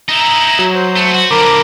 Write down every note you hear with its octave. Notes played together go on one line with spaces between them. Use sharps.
D#4 E4 A#5
F#3
C5
A3
F#4
D3 F3 A#4 A#5 B5 D6